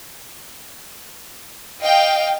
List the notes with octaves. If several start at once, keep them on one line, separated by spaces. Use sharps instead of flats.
D#5 F5 G5